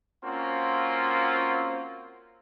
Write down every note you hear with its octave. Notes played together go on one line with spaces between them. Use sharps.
A#3 C4 C#4 F4 F#4